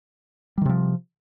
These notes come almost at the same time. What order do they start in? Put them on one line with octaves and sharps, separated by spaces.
G3 D#3 C3 F3